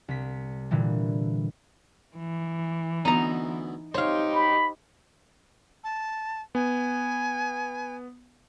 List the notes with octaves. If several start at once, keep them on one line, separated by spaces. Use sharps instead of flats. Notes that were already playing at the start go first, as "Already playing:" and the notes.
C2 B6
A#2 D3 E3 G3
E3
D2 B3 D#4 A#5
D#4 G4 C5 C#5 F5
B5
A5
B3 G#5